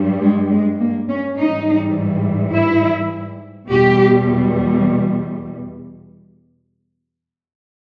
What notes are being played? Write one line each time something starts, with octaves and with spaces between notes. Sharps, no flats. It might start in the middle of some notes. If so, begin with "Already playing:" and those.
Already playing: G2 G3
G#3
G#3
A#3
C#4
G#2 E3 G3 D#4
E4
E2 B2 G3 G4